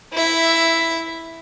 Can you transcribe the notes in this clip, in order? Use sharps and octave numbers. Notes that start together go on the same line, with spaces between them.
E4 E5